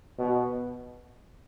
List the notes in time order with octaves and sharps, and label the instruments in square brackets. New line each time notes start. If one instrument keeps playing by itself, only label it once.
[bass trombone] B2